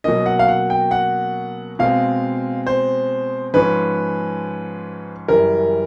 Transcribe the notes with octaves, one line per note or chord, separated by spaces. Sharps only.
B2 F#3 A#3 C#4 D#5
F#5
F5
F#5
G5
F#5
B2 G#3 C4 F5
C5
G#2 F3 G#3 C#4 B4
F#2 C#3 E3 G3 A#4